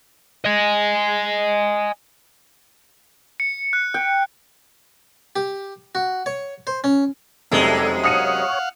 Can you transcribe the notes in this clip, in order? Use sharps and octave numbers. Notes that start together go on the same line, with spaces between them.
D#5 G#5
C#7
F#6
G5
G4
F#4
C#5
C5
C#4
F1 F#2 C3 G#3 A4 D5 E5
C#5 F5 F#5 D#6 C#7 D#7